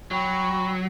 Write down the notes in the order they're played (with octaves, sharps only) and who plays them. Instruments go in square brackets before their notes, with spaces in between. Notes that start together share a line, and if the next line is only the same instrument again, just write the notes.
[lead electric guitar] F#3 [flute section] G5 B5 C#6